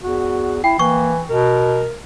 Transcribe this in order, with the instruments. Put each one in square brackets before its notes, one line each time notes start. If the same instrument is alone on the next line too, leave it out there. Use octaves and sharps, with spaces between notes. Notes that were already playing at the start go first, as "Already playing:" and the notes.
[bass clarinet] E2 [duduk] F#4
[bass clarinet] E4 [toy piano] G5
[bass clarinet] E3 [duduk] A#3 [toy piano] C#6
[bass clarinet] B2 [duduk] A#4